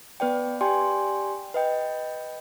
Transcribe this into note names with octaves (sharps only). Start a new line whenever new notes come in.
B3 B4 D5 G5
G4 D5 G5 G#5 C6
B4 D#5 G5